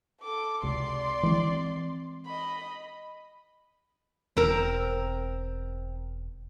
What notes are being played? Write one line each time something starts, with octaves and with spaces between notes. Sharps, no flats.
A4 D6
C#2 C3 D5 C6
E3 G#3 C4
D#5 B5
E1 C4 A#4